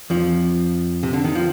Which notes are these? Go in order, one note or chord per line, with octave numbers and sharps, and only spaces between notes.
F2 F3
C3
D3
D#3
F3